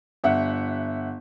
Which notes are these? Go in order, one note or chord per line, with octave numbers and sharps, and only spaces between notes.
G1 E5 F#5